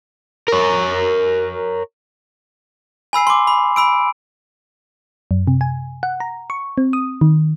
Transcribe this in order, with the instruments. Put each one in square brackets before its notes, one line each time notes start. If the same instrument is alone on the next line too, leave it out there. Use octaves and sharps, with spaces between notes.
[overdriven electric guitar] A#4 C#5
[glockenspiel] G#5 B5 E6 C7
C6 D6
B5
B5 E6 D7
[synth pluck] F#2
C3
G#5
F#5
A#5
C#6
C4
D#6
D#3